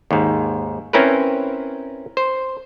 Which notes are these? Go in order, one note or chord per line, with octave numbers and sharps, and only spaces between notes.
D#2 G#2
C4 C#4 E4 A#4 B4
C5